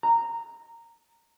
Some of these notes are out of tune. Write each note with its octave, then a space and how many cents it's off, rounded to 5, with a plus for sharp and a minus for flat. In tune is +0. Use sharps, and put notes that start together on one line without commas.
A#5 -10